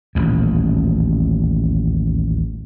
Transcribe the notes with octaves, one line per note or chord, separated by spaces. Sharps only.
D#1 A1 D2